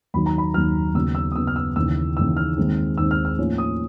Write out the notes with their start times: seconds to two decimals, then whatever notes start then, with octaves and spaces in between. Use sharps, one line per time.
0.14 D#2 D#3 F#3 B5
0.26 A#5
0.38 B5
0.54 D#2 D#3 F#3 F6
0.95 D#2 C#3 F#3 B3 E6
1.15 E6
1.32 D#6
1.35 D#2 C#3 F#3 B3 E6
1.47 F6
1.56 E6
1.76 D#2 C#3 E3 E6
2.17 D#2 C#3 E3 E6
2.37 F6
2.57 D#2 D#3 G#3 C4
2.98 D#2 D#3 G#3 C4 E6
3.11 F6
3.25 F6
3.38 A2 F3 A#3 C#4
3.58 D#6